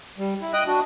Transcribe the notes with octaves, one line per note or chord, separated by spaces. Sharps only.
G3
E4
D#5 G5 D#6 F#6
D4 F#4